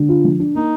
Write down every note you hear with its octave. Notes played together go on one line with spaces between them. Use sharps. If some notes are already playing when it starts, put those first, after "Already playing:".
Already playing: D3
F4
F3
D4
A#3 D#4